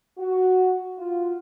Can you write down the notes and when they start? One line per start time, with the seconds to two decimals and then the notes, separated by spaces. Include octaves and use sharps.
0.18 F#4
0.98 F4